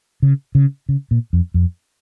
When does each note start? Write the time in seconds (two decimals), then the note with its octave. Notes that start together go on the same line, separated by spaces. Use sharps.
0.22 C#3
0.55 C#3
0.89 C#3
1.11 A#2
1.33 F2
1.54 F2